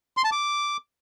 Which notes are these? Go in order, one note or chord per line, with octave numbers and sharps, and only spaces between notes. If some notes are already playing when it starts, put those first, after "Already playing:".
C6
A5
D6